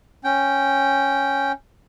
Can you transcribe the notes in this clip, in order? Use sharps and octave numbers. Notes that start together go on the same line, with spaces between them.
C#4 G5